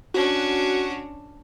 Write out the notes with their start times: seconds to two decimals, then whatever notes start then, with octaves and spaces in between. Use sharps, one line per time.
0.14 C#4 D4 F#4